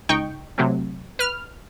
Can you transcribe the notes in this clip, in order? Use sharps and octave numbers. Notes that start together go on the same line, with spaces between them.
C#2 D#4 G5 C#6
C3 F#3 A3 C4
B4 F6